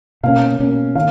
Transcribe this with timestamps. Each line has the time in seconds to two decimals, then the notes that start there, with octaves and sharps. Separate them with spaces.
0.23 B2 A#3 C#4 F5
0.60 B2 A#3 C#4
0.95 D#3 F5